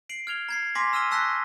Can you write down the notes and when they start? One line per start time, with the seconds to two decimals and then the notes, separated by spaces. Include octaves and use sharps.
0.09 C7 D7 F#7
0.27 F6 G#6 F7 G7
0.49 A#5 G#6 C7
0.75 G#5 C6 D6 A#6 B6
0.93 A#5 E6 F6 B6 D#7 G7
1.11 A5 C#6 E6 F#6 A#6 B6